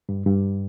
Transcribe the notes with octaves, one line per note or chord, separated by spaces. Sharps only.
G2
G2